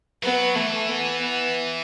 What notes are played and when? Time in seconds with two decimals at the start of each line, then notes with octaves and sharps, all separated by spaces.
0.23 F#3 B3
0.56 E3 A3
0.89 B3
1.22 B3